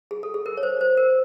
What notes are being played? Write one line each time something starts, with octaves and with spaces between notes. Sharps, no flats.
G#4
A4
G#4
A#4
C#5
C5
C5
A#4